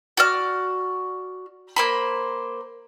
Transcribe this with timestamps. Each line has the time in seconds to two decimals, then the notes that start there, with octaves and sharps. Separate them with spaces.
0.17 F#4 D5 F6
1.76 A#3 C5 B5